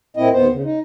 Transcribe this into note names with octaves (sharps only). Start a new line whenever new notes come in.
A#2 C4 E4 D#5
D#2 B3 C5
C#3
D#4